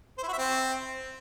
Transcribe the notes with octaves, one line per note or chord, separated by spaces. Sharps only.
C5
E4
F#4
E5
C4